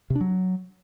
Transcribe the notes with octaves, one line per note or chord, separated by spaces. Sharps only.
C3
D4
F#3